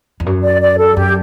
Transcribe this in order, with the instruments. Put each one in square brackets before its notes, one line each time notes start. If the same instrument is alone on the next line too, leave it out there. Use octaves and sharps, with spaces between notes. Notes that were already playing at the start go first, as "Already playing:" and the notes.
[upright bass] E2
F#2
[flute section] D5
D5
A4
[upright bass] F#2 [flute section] G4